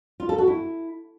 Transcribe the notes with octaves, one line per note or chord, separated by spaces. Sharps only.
F4
A4
F#4
E4